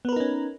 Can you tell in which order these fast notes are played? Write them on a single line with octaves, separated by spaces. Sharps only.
B3 B4 A#4 D#4 C#4